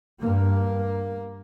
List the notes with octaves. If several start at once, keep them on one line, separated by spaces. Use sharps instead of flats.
G2 A#3